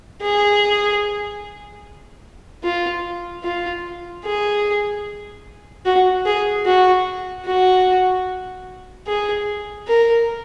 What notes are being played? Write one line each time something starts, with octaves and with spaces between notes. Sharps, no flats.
G#4
F4
F4
G#4
F#4
G#4
F#4
F#4
G#4
A#4